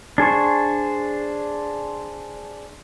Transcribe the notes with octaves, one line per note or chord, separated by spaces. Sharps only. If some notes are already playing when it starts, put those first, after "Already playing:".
D4 G#4 C5 C#6